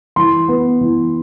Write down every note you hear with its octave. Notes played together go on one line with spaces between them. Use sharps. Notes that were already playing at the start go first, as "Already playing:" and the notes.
E3 C6
B3
E3